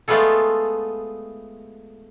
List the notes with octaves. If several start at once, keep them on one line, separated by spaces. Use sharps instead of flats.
G#3 A3 B3 F4 G#4 A4